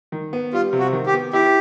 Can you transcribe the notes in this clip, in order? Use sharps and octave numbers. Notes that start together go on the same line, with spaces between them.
D#3
B3
G3 F4
C3
F#4
D#3
G4
B3
E4 G4